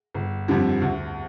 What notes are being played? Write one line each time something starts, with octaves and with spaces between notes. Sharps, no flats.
G1
F2 D3 G3
D2